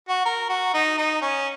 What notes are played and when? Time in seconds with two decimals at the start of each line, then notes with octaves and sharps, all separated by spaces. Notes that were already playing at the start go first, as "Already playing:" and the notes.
0.09 F#4
0.26 A#4
0.50 F#4
0.74 D#4
0.98 D#4
1.22 C#4